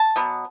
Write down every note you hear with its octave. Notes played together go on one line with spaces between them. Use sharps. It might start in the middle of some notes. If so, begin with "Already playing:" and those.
Already playing: A5
B2 F#3 B3